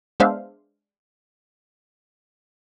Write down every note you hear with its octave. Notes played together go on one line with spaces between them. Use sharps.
G#3 B3 D4 C5 E5 F5